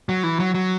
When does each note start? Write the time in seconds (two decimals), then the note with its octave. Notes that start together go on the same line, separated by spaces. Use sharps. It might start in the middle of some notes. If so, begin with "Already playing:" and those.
0.09 F#3
0.24 E3
0.40 F#3
0.54 F#3